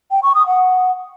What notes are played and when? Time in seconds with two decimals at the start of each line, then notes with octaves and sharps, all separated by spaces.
0.11 G5
0.23 C#6
0.35 D#6
0.47 F#5